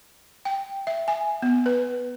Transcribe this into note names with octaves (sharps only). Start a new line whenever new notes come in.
G5
E5
G#5
B3
B4